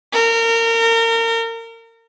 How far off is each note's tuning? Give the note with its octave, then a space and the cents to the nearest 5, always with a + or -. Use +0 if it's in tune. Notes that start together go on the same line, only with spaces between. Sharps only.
A#4 -30